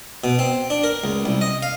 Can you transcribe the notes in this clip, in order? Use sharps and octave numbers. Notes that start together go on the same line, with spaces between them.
B2
C4
D4
A#4
C#2
C2
D#5
F5